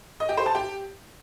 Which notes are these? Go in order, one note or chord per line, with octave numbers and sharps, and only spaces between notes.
D#5
G4
C5
A5
G4